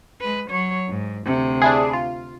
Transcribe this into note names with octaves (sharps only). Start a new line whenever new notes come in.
G#3 B4
F#3 C#5
G#2
D2 C3
D4 E4 G#4
F4